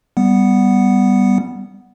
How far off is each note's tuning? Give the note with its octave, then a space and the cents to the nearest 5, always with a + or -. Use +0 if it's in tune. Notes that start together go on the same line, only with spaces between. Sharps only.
G3 +0 B3 +0 F#5 +0